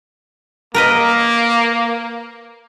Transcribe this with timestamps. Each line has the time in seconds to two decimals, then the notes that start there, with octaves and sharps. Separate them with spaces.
0.74 A#3 A#4 B4 D#5